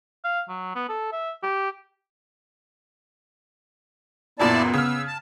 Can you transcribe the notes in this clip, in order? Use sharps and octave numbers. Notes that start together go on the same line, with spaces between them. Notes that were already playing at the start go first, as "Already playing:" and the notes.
F5
F#3
B3
A4
E5
G4
F#1 F#2 A#2 B3 E4 D5 A5
C#3 E6 F6
A5